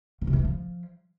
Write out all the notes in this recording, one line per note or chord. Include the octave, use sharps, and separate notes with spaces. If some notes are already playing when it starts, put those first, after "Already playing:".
D#3
C3
E3
A3
F3